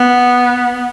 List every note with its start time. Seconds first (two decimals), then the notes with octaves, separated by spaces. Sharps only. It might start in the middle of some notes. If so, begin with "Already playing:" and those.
Already playing: B3